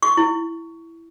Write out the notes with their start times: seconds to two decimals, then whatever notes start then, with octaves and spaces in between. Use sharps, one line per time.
0.03 C#6
0.17 E4